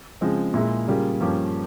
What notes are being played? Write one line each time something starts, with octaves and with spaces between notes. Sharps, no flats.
C#3 F3 G#3 C4
A#2 G#3 E4 G#4
C#3 G3 A#3 F4 G#4
G2 F3 A#3 C#4 G4